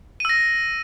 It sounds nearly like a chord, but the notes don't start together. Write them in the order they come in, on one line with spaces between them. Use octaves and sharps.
D#7 E6 A#6